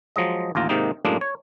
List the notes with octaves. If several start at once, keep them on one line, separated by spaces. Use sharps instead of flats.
F3 F#3 G#3 D#5
A1 D#2 F4 A#5
G#2 C3 D#3 A#3 D#4
F#2 A2 G#3 A#3 D4 D#4
C#5